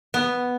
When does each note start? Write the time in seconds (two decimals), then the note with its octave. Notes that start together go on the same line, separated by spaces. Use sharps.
0.14 B3